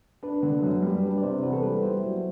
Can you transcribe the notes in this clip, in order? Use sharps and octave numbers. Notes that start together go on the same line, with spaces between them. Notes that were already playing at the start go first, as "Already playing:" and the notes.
D4 B4
D3
F#2
G3
D4 B4
D5
C3 C5
E2 B4
A4
G3 B4
E4 C5
F#3